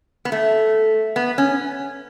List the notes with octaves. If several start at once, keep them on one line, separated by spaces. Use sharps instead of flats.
B3
A3
B3
C#4